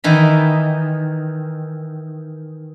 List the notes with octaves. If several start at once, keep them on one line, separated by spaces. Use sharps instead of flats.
D#3 E3 D#4 B5